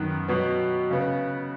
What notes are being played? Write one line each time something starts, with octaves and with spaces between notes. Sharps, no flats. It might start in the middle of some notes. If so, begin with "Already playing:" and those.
Already playing: F#2 D#3 B3
B2 F#3 B3
C#3 B3